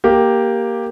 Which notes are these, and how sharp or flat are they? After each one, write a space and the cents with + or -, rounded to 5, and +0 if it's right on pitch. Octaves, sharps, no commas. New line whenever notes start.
A#3 +0 G4 +0